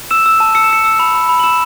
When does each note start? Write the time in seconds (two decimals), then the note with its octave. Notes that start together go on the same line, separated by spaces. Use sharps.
0.11 E6 E7
0.26 E6
0.40 A5
0.55 E6 C#7
0.64 E7
0.70 E6 C#7
0.85 E6
0.99 B5
1.15 B5
1.29 B5
1.40 F#7
1.44 E6 E7